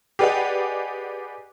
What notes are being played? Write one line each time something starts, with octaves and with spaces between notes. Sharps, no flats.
G4 G#4 B4 D5 D#5 F#5